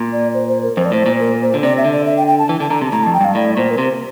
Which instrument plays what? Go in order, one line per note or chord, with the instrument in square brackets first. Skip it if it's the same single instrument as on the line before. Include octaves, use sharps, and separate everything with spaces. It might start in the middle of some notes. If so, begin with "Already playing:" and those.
Already playing: [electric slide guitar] A#2
[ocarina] D5
C5
C5
A#4
[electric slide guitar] F2 [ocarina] C5
[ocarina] D5
[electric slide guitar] A2 [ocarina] C5
[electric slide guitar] A#2
[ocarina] A#4
C5
[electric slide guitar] D3
[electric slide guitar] C3 [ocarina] D5
[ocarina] E5
[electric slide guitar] D3
[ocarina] D5
E5
G5
G5
A5
[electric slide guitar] E3
[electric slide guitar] D3 [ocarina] A5
[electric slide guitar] D3 [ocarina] A#5
[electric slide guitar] C3
[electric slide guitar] A2 [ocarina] A#5
[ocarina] A5
[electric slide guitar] F2
[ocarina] G5
[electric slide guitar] G2 [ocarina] F5
[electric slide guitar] A2 [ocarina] D5
[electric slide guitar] A#2 [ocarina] C5
[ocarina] A#4
[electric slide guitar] C3 [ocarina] C5